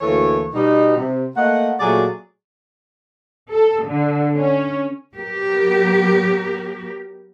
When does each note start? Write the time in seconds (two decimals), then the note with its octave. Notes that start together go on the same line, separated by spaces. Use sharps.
0.01 D2 E3 A#3 A4 C#5
0.54 B2 G3 D#4
0.96 C3
1.36 A3 A#3 D#5 F#5
1.80 A#2 F#3 A3 F#4 G#4 D5
3.51 A4
3.86 D3
4.37 C#4
5.17 F#3 B3 G4 A#4